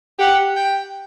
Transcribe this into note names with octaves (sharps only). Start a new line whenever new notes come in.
G4 F#5
G5